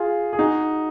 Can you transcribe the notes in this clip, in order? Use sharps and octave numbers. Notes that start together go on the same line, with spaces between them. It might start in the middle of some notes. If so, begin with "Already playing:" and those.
Already playing: F4 G#4
G#4
D#4 F#4